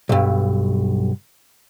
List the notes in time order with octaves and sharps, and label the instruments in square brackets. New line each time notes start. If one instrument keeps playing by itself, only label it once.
[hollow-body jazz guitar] B1 G2